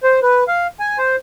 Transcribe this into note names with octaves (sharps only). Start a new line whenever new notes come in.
C5
B4
F5
G#5
C5